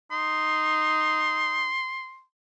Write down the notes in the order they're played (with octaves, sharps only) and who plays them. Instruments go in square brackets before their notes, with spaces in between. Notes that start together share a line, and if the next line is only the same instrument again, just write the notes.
[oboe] D#4 [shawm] C6